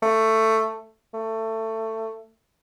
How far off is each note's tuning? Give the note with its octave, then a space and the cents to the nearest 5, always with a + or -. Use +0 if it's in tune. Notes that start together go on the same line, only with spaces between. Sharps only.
A3 +10
A3 +20